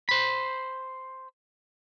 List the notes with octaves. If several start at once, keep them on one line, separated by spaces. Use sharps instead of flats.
C5 B5